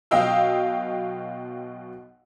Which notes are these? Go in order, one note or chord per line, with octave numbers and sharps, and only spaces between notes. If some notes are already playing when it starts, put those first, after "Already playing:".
B1 B2 D#5 F5 G5 E6